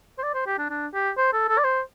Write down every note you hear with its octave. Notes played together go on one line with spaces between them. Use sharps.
C5
D5
C5
G4
D4
D4
G4
C5
A4
A4
D5
C5